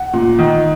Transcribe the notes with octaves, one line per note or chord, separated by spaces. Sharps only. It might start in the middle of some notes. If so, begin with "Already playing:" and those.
Already playing: F#5
A#2
D#3